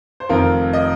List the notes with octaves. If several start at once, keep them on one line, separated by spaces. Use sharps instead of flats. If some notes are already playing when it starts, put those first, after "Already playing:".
C5
F1 F2 D#3 F4 A#4
D#5